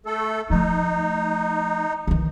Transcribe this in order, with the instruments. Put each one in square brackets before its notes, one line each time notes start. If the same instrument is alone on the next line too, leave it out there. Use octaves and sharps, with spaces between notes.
[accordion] A3 A4
[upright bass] F3 A3 [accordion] D#4
[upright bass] D#3 E3